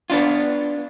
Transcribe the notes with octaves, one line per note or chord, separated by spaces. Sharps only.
B3 D4 F4